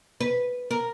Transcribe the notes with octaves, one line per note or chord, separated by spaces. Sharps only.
B4
A#4